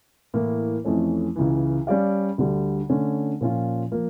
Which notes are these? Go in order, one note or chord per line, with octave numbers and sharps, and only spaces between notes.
A2 E3 A#3
F2 E3 A3 C#4
C#2 C#3 E3
G3 C#4 G4 D5 F5
D2 D3 G3
D3 A3 C#4
A#2 F3 C#4 F4
F3 A#3